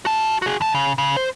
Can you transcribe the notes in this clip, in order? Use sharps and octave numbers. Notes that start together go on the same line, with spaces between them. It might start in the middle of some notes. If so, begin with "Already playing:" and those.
F#4 A5
F#4 G#4
E2 A5
C#3
C#3
C5